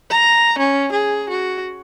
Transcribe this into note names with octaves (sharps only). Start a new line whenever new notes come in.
A#5
C#4
G#4
F#4